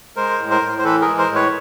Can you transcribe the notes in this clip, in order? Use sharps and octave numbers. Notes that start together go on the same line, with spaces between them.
G#3 A#4 C5
A2
A#4 C5
A2
C5
E3 A4 B4
G#4 A#4
G#3
A#4 C5
A2
B4 C#5